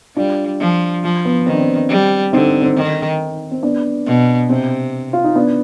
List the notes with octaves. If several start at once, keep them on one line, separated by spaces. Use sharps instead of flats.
G3 D4 F4
F3
F3
B3
D#3 C4
D4
C4
G3
D3 C4 D#4
C4
D#3
C4
B3 D4
B2
C3 C4
F4
D#4
B3 D4